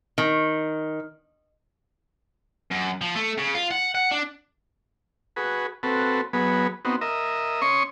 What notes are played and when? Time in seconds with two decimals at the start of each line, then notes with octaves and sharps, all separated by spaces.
0.18 D#3
2.71 F#2
3.01 F3
3.15 A3
3.38 C#3
3.55 F4
3.71 F#5
3.95 F#5
4.11 D4
5.36 F#4 G#4 B4
5.83 C4 F#4 A4 B4
6.33 F#3 B3 G#4 B4
6.85 B3 C4 D#4 F#4
7.01 A#4 D#5 E5
7.62 C#4 C#5 C6 C#6 D#6